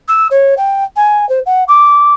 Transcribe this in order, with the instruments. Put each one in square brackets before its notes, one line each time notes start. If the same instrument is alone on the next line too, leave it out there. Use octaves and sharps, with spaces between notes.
[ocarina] E6
C#5
G5
G#5
C5
F#5
D6